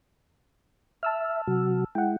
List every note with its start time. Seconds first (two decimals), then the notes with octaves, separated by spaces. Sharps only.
1.03 E5 A5 E6 F6
1.47 C3 F#3 F#4
1.95 G#3 E4 F#5 G5